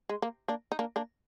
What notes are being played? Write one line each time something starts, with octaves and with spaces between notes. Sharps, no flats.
G#3
A#3
A#3 D4
D#4
A#3 D4
A#3 D4